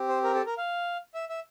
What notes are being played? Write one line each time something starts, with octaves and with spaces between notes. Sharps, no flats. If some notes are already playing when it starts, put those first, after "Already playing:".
Already playing: C4 G4
C5
A#4
A4
A#4
F5
E5
E5